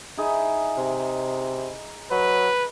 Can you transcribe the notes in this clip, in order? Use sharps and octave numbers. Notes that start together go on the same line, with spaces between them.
D#4 E4 G#4
C3
F#3 B4